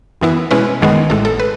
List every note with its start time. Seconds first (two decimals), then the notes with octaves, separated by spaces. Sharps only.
0.21 F#2 E3 B3 E4
0.51 B2 G#3 C#4 E4 B4
0.81 G#1 F#2 D#3 G#3 B3
1.10 A1 A2 G#3 A4
1.25 A4
1.40 B4